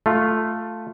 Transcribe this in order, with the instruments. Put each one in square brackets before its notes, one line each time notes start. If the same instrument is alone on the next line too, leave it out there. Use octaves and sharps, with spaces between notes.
[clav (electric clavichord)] A3 F4